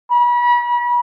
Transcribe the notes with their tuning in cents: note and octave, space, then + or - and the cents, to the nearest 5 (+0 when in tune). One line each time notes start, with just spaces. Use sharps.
B5 -35